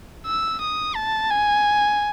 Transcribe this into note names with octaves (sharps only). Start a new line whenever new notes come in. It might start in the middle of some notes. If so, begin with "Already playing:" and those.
E6
D#6
A5
G#5